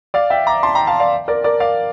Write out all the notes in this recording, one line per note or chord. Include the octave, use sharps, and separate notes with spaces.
D5 F5
E5 G5
A#5 D6
A5 C6
G5 A#5
F5 A5
D5 F5
A#4 D5
A#4 D5
D5 F5